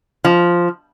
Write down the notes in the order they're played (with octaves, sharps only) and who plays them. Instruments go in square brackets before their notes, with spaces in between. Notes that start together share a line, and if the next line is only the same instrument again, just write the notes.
[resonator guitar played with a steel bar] F3